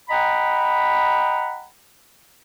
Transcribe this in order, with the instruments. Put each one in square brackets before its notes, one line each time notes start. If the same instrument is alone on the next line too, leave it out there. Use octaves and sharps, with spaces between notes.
[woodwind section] D#5 F#5 G5 A#5 B5